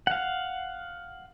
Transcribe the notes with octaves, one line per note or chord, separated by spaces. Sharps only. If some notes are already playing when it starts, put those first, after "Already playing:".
F5 F#5